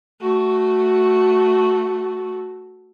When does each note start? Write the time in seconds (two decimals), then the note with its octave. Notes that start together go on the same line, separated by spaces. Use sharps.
0.21 A3 F#4